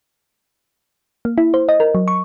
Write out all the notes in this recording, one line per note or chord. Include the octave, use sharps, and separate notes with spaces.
A#3
E4
C5
D#5
A#4
F#3
C#6